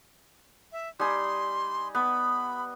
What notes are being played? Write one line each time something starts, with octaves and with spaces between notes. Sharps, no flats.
E5
G3 D#4 G#5 C6
B3 B5